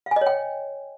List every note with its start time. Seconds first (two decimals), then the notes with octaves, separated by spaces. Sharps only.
0.06 F5
0.11 G#5
0.16 D#5
0.21 C#5
0.26 G5